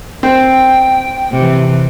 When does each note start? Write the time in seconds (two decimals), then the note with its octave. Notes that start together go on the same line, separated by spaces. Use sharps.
0.23 C4 G5
1.32 C3 E3